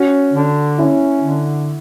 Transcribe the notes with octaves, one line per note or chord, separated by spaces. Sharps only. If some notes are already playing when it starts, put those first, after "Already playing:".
Already playing: C#4 F#4
D3
C#4 E4
D3